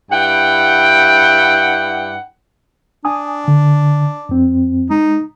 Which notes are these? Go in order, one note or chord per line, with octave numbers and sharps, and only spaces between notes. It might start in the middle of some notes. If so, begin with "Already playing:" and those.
G2 E4 F#5 G5
D4 G#5 D#6
D3
F2 C4
G#3 D#4